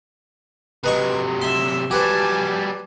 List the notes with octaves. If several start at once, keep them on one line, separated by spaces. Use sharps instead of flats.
C3 F#3 B4 D#5 C#6
E5 C6 E6 B6
F#3 G3 G4 B4 C5 G#5 A5